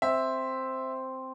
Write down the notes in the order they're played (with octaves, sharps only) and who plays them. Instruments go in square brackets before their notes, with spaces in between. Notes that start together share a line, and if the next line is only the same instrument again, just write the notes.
[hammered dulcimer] C4 [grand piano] E5